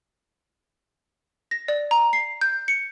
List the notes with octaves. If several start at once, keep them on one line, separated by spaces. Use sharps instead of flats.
A#6
D5
A#5
C7
G6
C#7